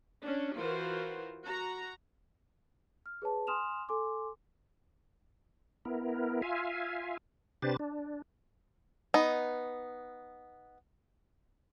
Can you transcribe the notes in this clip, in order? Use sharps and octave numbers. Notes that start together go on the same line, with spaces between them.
C#4 D4
E3 F4 F#4 A#4 C5
F#4 A#5
F6
G#4 B4 C#5 A5
G#5 C6 D#6 F6 E7 F7
A4 G#5 C6 D6
B3 E4 A#4
F4 E5 F5 G#5
C3 D4 G4 B4 C5 A6
D4
B3 D#4